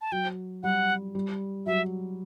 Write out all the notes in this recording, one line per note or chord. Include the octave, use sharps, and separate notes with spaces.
A5
F#3 G5
G3 F#5
G3
F#3 E5